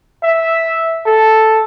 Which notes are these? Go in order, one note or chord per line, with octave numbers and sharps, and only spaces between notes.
E5
A4